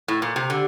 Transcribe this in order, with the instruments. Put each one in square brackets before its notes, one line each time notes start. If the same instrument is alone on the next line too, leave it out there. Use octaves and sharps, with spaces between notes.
[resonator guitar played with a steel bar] A2
A#2
C3
[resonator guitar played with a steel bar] D3 [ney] G4